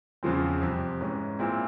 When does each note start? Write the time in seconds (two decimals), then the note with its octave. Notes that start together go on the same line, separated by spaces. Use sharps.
0.23 E2 C#3 F3 C4
0.61 F2 C3 G3
1.01 G#2 E3 G#3 C#4
1.39 A#2 G#3 C4 E4